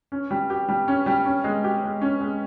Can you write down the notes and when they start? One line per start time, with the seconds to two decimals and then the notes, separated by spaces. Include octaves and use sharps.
0.12 C#4
0.31 G3
0.50 G4
0.69 G3
0.88 C#4
1.06 G3
1.25 C#4
1.44 G#3
1.64 G4
1.84 G#3
2.02 C#4
2.21 G#3